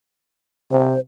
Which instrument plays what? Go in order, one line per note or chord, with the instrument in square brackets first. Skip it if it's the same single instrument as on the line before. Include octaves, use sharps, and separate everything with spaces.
[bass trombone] C3 [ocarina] C5